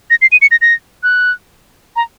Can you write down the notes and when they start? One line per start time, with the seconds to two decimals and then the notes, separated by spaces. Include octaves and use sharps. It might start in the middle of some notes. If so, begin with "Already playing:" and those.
0.10 A#6
0.22 C7
0.32 D#7
0.42 C#7
0.51 A#6
0.62 A#6
1.03 F#6
1.96 A#5